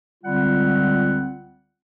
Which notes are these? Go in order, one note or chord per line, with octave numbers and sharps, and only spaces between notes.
C#2 D3 G3 C4 F4 F#5